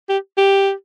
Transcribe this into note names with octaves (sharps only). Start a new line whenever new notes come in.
G4
G4